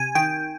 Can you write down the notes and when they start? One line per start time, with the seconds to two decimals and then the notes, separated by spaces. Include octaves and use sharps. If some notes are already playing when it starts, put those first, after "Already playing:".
Already playing: C3 G#5
0.15 D#3 G5